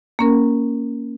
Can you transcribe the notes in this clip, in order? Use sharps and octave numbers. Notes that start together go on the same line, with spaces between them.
A#3 C#4 A#4